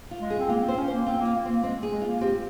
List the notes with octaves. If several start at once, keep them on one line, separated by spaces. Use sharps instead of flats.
F4
G#3
G#4
C4
A#3 F4
C4
C5
C#4
C5
A#3
C4 F4
A#3 F4
A#3
A#3 C4
G#3 C4
G#4
G#3
A#3 F4
C4 G4